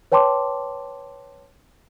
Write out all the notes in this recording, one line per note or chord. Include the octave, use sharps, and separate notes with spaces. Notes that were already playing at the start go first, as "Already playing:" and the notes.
B4 C#5 G5 A5 C6 D6